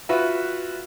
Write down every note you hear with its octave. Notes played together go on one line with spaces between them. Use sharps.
F4 F#4 B4 E5